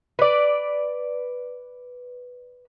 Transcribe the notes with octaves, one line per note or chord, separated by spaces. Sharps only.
B4 D5